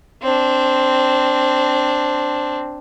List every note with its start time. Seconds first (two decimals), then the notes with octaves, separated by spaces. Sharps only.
0.22 C4 D4